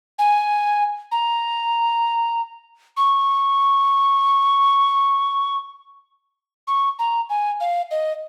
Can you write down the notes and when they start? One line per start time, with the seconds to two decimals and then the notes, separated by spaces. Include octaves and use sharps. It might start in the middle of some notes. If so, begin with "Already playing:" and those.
0.19 G#5
1.12 A#5
2.97 C#6
6.68 C#6
6.99 A#5
7.30 G#5
7.60 F5
7.91 D#5